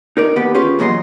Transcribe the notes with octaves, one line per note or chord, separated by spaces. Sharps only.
D#4 A#4 D5
D#2 B3 G4 B4 F#5
C#4 F4 G4 G#4 B4
E2 A#2 F#3 D#5 B5 C6